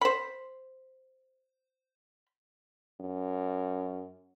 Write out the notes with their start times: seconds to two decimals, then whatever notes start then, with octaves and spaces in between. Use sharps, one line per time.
0.01 C5 B5
3.01 F#2